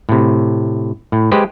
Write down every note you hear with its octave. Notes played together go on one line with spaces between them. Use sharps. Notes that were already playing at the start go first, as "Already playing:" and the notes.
A2 C3
A2
G#3 G4 B4 C5